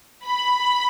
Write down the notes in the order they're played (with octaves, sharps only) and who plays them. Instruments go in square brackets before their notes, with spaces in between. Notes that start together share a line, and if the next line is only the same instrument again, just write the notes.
[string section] B5